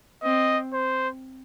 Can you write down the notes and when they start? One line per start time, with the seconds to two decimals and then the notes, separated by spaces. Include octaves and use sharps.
0.23 C4 D#5
0.73 C5